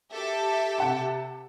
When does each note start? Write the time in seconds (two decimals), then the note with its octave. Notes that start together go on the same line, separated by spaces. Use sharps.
0.13 G4 A4 E5
0.78 C3 F#5 A5